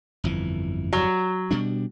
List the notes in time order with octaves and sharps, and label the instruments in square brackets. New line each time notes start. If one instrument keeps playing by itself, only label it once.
[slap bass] G1 F2 E3
[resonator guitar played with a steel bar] F#3
[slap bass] B2 G3 D4